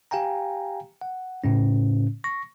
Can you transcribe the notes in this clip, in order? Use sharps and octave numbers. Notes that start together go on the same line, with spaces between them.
G4 F5 G5 G#5 A#5
F#5
A2 C#3 C#4
C#6 A#6